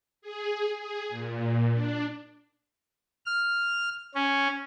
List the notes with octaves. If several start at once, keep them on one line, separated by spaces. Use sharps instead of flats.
G#4
G#4
A#2
D4
F6
C#4